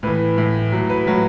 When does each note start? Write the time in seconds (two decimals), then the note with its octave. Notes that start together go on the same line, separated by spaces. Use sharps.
0.03 A2 E3 B4
0.38 A2 E3
0.72 A2 F#3
0.90 B4
1.07 A2 F#3